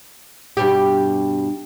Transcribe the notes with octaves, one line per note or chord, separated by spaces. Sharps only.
G2 B2 G4